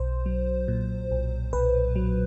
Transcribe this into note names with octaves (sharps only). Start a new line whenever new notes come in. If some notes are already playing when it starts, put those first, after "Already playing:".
Already playing: B1 C5
F#3
A#2
B1
B1 B4
F#3